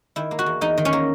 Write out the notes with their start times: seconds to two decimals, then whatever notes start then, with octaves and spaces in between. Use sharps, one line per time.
0.16 D#3 E4
0.31 A#3
0.39 F#4
0.46 E2
0.61 E2 D#4
0.78 D#3
0.85 C#4
0.93 A#3